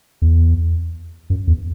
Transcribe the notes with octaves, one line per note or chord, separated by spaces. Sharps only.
E2
F#2
E2